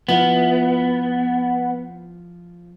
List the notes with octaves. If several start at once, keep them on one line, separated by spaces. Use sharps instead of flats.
F3 B3 E4 F4